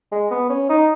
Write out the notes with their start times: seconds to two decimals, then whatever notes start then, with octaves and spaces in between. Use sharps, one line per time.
0.12 G#3
0.31 B3
0.50 C#4
0.69 D#4